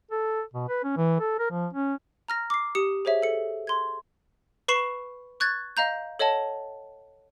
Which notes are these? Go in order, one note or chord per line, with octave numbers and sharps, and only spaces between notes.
A4
B2
B4
C#4
E3
A4
A#4
F3
C#4
A#5 F6 A#6
D6 C7
G4 D#6 C#7
G#4 C5 C#5 E5
A4 C#7
C6 G#6
B4 B5 C#6 C7 E7
C#6 F#6 G#6 A6
D#5 F5 A#5 G6
A4 C#5 D#5 F#5 A5